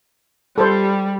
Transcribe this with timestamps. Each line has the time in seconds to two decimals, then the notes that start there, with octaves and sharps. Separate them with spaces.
0.58 G3 A4 C5